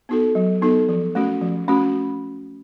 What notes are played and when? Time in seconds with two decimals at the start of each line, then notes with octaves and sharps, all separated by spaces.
0.09 B3 D#4 F#4 A4
0.35 F#3
0.62 B3 D#4 F#4 A4
0.89 F3
1.15 A3 C#4 F#4
1.41 F3
1.68 A3 C#4 F#4